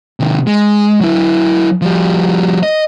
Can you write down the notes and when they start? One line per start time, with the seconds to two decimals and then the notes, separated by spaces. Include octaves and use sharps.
0.20 C3 D#3
0.47 G#3
1.01 F#3 E4
1.82 F3 G3
2.63 D#5